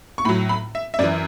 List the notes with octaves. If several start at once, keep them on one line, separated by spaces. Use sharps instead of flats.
C#6
A2 F#3 B5
B5
E5
E5
F#2 E3 D5